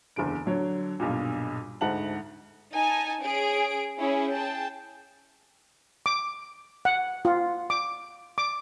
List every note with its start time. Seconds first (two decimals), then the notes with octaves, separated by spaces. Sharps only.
0.16 F#1 E2 D3 D7
0.46 D3 F#3 C#5
1.00 B1 G2 A#2
1.81 D2 G#2 F#5 A5 F#7
2.74 D#4 G#5 A5
3.24 C#4 G#4 D7
3.99 C#4 E4 G#4
4.32 G#4 G5 A5
6.06 D6
6.85 F#5
7.25 F4
7.70 D6
8.38 D6